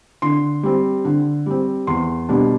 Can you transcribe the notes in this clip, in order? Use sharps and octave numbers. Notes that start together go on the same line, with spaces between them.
D3 C6
G3 C4
D3
G3 C4
E2 C6
B2 G3 D4